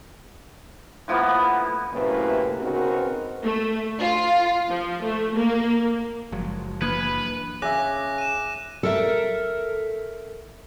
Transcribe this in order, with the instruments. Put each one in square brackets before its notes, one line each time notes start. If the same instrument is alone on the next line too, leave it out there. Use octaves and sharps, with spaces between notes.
[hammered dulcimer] A2 F3 A#3 B3
[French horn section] F#2 A2 C3 A#3 B4
C#3 B3 C4 D#4 F#4 A#4
[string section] A3
F4
F3
A3
A#3
[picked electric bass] F#1 F#3 [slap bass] F3 G#3
[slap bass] E3 D4 [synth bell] A#3 G#6 C#7 [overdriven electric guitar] B4
[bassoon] C#3 [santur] E5 G#5 [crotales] D6 F#6 A#6
[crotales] D#7 E7
[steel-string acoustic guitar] A4 A#4 E5